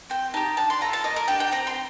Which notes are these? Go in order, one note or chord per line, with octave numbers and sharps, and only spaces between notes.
C4 G5
D#4 G4 A5
D4 A5
C6
F4 A4 A#5
A5
A#3 D#5
A#4
D4 G4 G5
G5
C4 A#5
C6